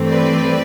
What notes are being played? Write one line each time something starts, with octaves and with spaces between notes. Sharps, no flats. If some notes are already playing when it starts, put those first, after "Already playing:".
Already playing: G2 E3 A3 C4
B4 D5